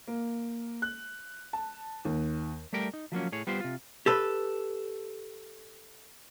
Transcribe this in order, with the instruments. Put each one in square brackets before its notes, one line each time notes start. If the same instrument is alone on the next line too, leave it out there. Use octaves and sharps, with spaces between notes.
[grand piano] A#3
F#6
A5
D#2
[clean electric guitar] G3 A3 G4 A#4 G5
D#4
F3 F#3 A#3 C#4
A2 G#4 C#5
G3 B3 F4 G4 C5
C3 F4
[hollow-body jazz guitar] G4 A4 B4